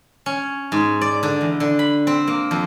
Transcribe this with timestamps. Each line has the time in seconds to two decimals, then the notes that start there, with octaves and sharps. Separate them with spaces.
0.26 C#4
0.72 G#2
1.01 D5
1.23 D3
1.41 E2
1.60 D3
1.79 B5
2.07 C4
2.27 A#3
2.51 F2